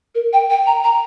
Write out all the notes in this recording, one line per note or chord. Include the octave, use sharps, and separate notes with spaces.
A#4
G5
G5
A#5
A#5